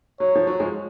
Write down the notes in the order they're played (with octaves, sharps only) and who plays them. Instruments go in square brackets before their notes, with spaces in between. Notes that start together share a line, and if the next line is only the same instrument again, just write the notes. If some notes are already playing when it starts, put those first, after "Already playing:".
[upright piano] F#3 [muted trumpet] C#5
[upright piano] F3
F#3
F3 G#3